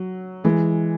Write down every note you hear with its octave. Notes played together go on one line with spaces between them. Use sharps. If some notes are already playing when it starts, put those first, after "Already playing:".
Already playing: F#3
E3 G#3